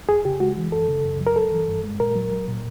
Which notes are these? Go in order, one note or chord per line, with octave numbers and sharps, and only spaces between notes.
F2 G#4
C#3 G4
G#3 F#4
E3
F#2 A4
C#3
F#2
F#3
A#4
G2 A4
E3
G2
G#3
A#2 A#4
F#3
F#3
A#2